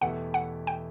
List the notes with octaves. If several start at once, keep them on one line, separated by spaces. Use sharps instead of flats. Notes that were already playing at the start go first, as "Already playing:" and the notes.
E2 B2 A3 E4 G4 F#5
F#5
G5